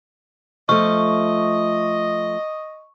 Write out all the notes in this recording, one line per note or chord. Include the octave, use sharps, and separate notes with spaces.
F3 A3 D#5 C#6